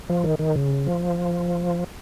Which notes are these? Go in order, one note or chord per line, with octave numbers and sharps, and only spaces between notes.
F3
D#3
D#3
C#3
F3